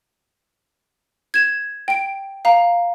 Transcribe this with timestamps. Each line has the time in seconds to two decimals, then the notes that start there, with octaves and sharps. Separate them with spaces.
1.34 G#6 E7
1.88 G5 D7
2.45 F5 A#5